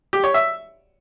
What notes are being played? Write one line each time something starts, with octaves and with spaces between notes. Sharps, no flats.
G4
C#5
E5